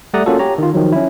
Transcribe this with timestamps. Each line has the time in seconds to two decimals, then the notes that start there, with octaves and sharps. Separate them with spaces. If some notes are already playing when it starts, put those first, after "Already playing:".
0.14 G3 A3 D5 F#5 A#5 D#6
0.26 A#3 C#4 F4 F#4 A4
0.39 G4 C#5 A#5
0.58 D#3 F4
0.74 D#3 F3 F#3
0.92 C#4 E4